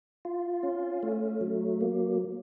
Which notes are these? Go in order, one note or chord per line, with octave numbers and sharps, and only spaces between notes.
F4
C#4
A3
F#3
A#3